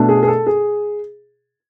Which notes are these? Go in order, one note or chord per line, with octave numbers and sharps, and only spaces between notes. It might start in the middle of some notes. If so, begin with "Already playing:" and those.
Already playing: B2 A3 D4
G#4
G#4
A4
G#4